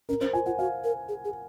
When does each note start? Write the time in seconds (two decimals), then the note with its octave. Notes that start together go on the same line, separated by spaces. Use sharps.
0.09 C#4 A#4
0.21 C#4 C5
0.33 F4 G#5
0.46 F4 F#5
0.59 F#4 F5
0.84 A#4
1.09 G#4
1.25 G#4